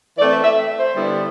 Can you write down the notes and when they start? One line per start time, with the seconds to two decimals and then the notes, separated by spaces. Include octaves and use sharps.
0.18 E3 A3 C4 D5
0.31 E5
0.44 E5
0.77 C5
0.95 D3 G3 B3 E4